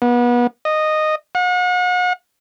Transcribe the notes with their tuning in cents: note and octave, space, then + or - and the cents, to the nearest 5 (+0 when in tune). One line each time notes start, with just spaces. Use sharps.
B3 -30
D#5 -10
F#5 -40